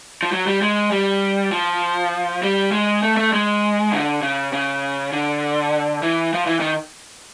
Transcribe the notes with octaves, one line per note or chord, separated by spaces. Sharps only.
F3
F#3
G3
G#3
G3
F3
G3
G#3
A3
A3
G#3
D3
C#3
C#3
D3
E3
F3
E3
D#3